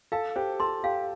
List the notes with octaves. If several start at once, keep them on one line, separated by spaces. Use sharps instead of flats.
A4 F5 A5
G4 C5 G5
A4 A5 C6
G4 F5 G5